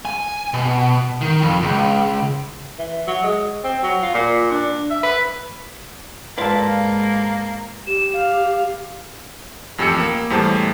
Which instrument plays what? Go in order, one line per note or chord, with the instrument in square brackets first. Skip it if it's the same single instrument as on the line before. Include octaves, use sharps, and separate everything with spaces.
[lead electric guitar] G#5
B2
D#3
F2
C#2
[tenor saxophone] E3
F#3
G#3
C4
F#3
F4
A#2
D4
E5
B4
[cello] G#2 [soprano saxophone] A#3 [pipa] F4 A4 [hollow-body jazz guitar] B4 D5 F5
[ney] G4 [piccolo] E7
[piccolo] F5
[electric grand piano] A1 F2 G4 G#5 E6 C#7
A#3
E2 A2 G3 C5 A5